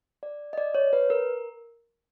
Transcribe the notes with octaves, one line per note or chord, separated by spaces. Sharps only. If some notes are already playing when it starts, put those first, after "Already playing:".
D5
D#5
D5
C#5
B4
A#4